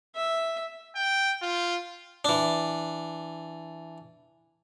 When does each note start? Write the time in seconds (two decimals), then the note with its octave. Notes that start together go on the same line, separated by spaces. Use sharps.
0.16 E5
0.95 G5
1.42 F4
2.25 E3 D4